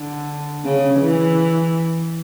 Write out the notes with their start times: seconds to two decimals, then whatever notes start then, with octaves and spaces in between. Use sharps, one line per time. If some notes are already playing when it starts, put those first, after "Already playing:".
Already playing: D3
0.64 C#3
1.00 E3